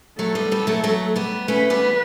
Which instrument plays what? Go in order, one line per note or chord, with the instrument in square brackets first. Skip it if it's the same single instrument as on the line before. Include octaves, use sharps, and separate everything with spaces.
[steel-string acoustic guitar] F#3 A3 [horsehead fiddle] A4
[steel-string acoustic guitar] G3 B3
G3 B3
F#3 A3
F#3 A3
G3 B3
[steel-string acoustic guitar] A3 C#4 [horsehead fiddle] B4
[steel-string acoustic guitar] G3 B3